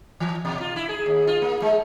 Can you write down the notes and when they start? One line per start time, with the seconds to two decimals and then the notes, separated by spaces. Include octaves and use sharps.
0.20 E3
0.45 B2
0.61 F4
0.76 E4
0.89 G#4
1.06 D#2
1.27 F4
1.42 A#3
1.62 G#3